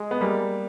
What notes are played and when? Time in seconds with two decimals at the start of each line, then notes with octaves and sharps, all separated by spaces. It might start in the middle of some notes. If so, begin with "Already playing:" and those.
Already playing: G#3
0.11 B3
0.21 G3 A#3